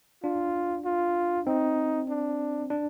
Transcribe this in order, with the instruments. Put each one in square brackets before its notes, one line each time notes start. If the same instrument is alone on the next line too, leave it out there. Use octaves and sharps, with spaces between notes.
[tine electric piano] D4 [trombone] F4
[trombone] F4
[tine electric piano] C4 [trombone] D#4
[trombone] D4
[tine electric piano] D4